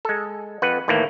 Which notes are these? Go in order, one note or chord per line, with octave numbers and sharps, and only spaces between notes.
G#3 A4
F2 B4 F#5
D#2 A2 E3 A3 A#3